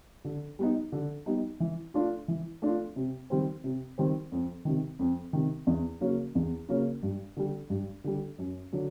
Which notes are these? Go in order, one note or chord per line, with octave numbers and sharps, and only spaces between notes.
D3
G3 B3 D#4
D3
G3 B3 D#4
E3
A3 D4 F4
E3
A3 D4 F4
C3
D#3 G3 C4
C3
D#3 G3 C4
F2
C3 D#3
F2
C3 D#3
E2
C#3 F#3 A#3 C#4
E2
C#3 F#3 A#3 C#4
G2
D3 G3
G2
D3 G3
F#2
D3 F#3